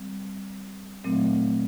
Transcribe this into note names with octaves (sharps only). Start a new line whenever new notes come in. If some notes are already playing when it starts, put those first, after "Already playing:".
Already playing: G3 C4
A#2 F#3 A3 C4